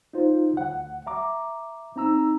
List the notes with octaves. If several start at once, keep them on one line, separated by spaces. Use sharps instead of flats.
D#4 F4 C5
D2 F#5
E5 A#5 D6
C4 D#4 A#5 E6